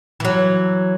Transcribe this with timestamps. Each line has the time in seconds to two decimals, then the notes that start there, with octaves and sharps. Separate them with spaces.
0.20 E3 F#3